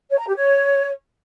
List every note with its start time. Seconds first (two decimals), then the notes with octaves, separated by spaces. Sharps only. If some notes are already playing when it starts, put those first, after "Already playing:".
0.10 C#5
0.18 A#5
0.26 G4
0.35 C#5